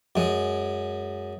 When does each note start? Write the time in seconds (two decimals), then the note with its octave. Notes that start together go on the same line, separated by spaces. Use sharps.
0.16 F#2 G#3